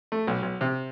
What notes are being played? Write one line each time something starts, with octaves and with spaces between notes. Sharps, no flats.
A3
B1
B1
C3